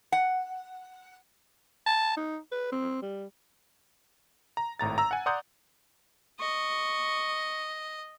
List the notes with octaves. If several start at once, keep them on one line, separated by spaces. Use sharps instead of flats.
F#5
A5
D#4
B4
C4
G3
A#5
G#1 A2 A#5 A6
A#5 E6
F#5 G#5
D5 F#5 A#5 C6 D#6 G6
D#5 C#6